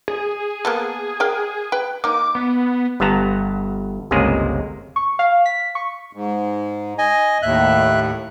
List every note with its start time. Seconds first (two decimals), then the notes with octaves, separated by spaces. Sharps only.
0.08 G#4
0.65 A#3 B3 A4
1.20 A#4 F5 G5
1.72 B4 G5
2.04 A#3 D#4 D6
2.35 B3
3.00 G1 G2 B3 A5 A#5
4.11 G1 C#2 C3 G#3 A#3 G#4
4.96 C#6
5.19 F5
5.46 B6
5.75 C#6
6.13 G#2
6.98 D#5 G#5
7.42 D#2 A2 E5 F#6